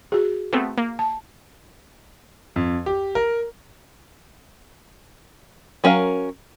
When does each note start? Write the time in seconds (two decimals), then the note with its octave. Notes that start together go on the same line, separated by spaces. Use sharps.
0.12 F#4 G#4
0.53 A3 B3 C4
0.77 A#3
0.99 A5
2.56 F2
2.86 G4
3.15 A#4
5.84 F#3 C#4 A#4 F5